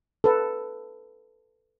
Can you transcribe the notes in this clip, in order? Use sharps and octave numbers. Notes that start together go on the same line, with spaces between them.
A4 B4